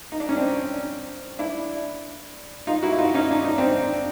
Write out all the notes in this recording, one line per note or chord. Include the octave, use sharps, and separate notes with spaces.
D#4
D4
C#4
C4 D4
D4 E4
D#4 F4
E4 F#4
E4
D#4 F4
C#4 D#4
D4
D#4
C4 D4